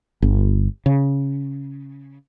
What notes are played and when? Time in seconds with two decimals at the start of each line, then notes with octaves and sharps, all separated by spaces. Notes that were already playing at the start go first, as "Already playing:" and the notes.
0.22 G1
0.86 C#3